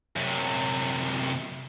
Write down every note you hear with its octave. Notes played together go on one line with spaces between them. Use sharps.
F#2 C3